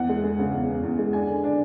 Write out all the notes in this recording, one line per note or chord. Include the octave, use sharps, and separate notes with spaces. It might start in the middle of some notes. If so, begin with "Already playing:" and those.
Already playing: E2 F#5
G#3
G#3
C#3
E2
E2
E2
G#3
D4 G#5
D3
D4